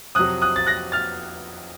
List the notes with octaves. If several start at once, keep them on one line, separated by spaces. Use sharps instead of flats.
F2 C3 F#3 D#6 F#6
D#6 F#6
A6
F#6 A#6
F6 A6